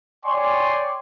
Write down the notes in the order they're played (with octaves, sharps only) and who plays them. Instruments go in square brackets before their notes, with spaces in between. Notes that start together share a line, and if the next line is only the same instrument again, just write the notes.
[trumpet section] C#5 D5 G5 G#5 C6 C#6